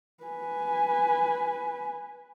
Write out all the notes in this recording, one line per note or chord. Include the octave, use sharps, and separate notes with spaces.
B4 G#5